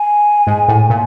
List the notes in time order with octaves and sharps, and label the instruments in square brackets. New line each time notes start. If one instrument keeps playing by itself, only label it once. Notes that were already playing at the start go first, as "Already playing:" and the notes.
Already playing: [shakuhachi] G#5
[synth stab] G#2
A2
A#2